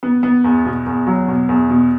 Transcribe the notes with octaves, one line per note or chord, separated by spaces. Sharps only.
B3
B3
E2
B2
E2
F#3
B2
E2
B2